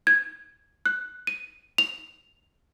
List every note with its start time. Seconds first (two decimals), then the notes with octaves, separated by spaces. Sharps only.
0.07 G#6
0.86 F#6
1.27 D#7
1.78 F7